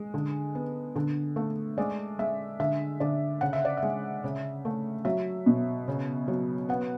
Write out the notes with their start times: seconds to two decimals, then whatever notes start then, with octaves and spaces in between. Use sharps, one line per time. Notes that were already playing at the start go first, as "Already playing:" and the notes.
Already playing: G#3
0.14 D3
0.55 B3
0.96 D3
1.36 A3
1.78 G#3 D5
2.19 G#3 E5
2.60 D3 E5
3.00 D3 D5
3.41 C#3 F#5
3.53 E5
3.65 D5
3.77 E5
3.83 G#3
4.24 C#3
4.65 A3
5.05 F#3 E5
5.46 B2
5.88 C#3
6.28 F#3
6.69 B3 F#5